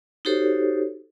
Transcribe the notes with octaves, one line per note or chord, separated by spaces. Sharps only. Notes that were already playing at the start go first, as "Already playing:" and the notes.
D#4 F#4 G4 A4 C5 C#5